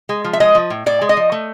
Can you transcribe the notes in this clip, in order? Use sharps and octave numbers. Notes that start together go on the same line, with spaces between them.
G#3
F3
E5
G#3 D#5
F3
A2
A2 D5
G#3
D#5
F3
A3